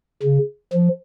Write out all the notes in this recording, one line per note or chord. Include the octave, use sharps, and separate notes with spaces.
C#3
F3